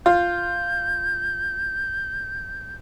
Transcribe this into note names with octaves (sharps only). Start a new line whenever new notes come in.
F4 G6